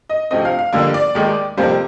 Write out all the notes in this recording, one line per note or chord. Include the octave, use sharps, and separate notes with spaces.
D#5
D2 C3 F3 C4 D#5
F5
F5
F2 D3 G3 A#3 F5
D5
D#2 D#3 G#3 D#4
F2 C3 G3 A#3 C5